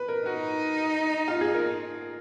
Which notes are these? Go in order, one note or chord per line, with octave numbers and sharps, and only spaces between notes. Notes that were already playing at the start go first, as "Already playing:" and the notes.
Already playing: B4
A#4
D#4 F#4
F4
G#4
A#4